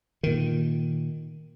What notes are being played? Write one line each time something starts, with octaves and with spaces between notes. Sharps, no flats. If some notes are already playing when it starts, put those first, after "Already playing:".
A#2 D#3